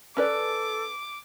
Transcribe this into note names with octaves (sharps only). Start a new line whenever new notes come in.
C#4 A4 B4 D5 D6